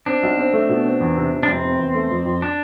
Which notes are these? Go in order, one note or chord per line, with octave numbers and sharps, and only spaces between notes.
C4 D4
B1
C4
A3
B2
C4
E2
C3
C3
D4
F1 C4
C3
E2
A3
F2
F2
D4